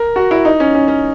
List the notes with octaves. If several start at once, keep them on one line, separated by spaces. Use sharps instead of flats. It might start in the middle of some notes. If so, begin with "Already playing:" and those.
Already playing: A#4
F#4
E4
D#4
C#4
C#4
C#4